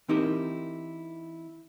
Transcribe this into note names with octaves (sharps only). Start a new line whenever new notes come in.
E3 C4 D#4 E4 G4 A#4